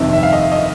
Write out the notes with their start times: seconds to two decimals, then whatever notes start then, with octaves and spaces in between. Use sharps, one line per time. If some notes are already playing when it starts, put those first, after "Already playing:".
Already playing: G1 F2 C3 D#3
0.13 E5
0.23 F5
0.32 D#5
0.52 D#5